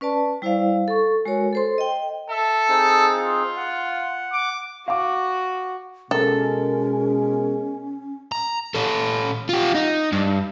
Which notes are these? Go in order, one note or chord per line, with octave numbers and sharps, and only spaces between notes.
C#4 B4 D5 A5
G3 E4 C5 D5 F5
A4 C#6
G#3 F#4 A#4 C#5
A4 C5 C6
D#5 G5
A4 E5
C4 D#4 G#4
F4
F#5
D6
F#4 F5 D6
B2 G#3 C#4 A4 A#4
A#5
C#4 A4
F4 G4
D#4
G2